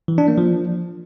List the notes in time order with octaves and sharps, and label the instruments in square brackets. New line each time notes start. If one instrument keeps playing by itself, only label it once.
[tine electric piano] E3
D4
A#3
F3